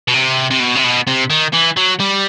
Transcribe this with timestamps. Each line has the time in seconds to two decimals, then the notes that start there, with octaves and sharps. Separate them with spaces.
0.08 B2
0.14 C3
0.50 C3
0.60 B2
0.75 C3
0.84 B2
1.07 C3
1.30 D#3
1.53 E3
1.77 F#3
2.00 G3